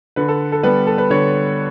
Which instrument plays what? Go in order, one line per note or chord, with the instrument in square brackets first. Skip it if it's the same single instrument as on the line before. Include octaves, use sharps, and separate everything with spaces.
[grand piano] D3 B4
A4
A4
G3 B3 B4
A4
B4
D3 C#5